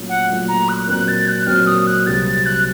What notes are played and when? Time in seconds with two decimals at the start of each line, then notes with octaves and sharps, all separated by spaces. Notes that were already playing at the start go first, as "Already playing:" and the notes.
Already playing: A#2 F#3 A3 C#4 F4
0.09 F#5
0.28 A#2 F#3 A3 C#4 F4
0.48 A#5
0.68 F#6
0.87 A#2 F#3 C4 F#4 A#4 F#6
1.08 A6
1.28 F#6
1.47 A#2 F#3 C4 F#4 A#4 F6
1.66 D#6
1.86 F#6
2.06 C2 C3 F#3 C4 F#4 A6
2.26 A6
2.46 F#6